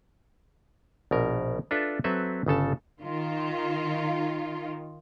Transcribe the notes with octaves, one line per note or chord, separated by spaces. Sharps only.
A#1 B2 A#4
D4 F4 A4 B4 E5
F#3 C4 A4 B4 E5
G1 C#3 A4 A5
D#3 F4